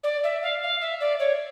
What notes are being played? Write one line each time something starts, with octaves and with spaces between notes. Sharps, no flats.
D5
E5
F5
F5
E5
D5
C#5